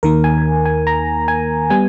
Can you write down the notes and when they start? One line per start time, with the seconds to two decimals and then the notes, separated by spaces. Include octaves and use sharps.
0.03 D#2 D#3 A#3 A#4
0.24 G#5
0.66 G#5
0.87 A#5
1.28 G#5
1.70 G3 B3 G#5